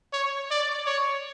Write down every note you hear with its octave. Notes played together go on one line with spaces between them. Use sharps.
C#5
D5
C#5